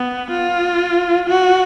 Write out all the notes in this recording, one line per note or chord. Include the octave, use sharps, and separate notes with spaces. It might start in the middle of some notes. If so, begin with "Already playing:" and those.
Already playing: B3
F4
F#4